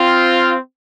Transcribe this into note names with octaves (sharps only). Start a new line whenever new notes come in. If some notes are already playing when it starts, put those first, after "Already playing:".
Already playing: C4 F4